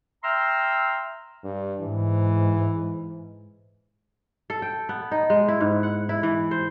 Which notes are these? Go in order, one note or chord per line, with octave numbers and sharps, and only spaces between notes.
E5 G5 A#5 C6 E6 F6
G2
G#2 E3
A4
G5
B3
D#4
G#3
E4
G#2
F#5
E4
E3
C5